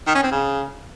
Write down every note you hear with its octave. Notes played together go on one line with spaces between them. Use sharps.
D#3
C#4
C4
C#3